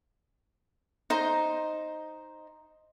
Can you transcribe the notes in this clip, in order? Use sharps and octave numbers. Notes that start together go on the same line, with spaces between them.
D#4 C5 A#5